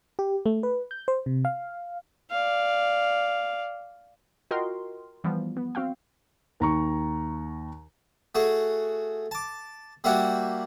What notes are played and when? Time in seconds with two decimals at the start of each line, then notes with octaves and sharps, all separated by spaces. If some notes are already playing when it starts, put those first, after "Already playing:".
0.19 G4
0.46 A3
0.63 B4
0.91 G6
1.08 C5
1.26 C3
1.45 F5
2.31 D5 F5
4.51 F4 F#4 A#4 D#5 G5 C6
5.24 E3 F3 G3 B3
5.57 B3
5.75 C4 F#4 F5 G5
6.60 D#2 A#5 C#6
8.35 A3 F#4 G#4
9.31 A5 D6
10.04 G3 A#3 E4 F#4 G4 F#5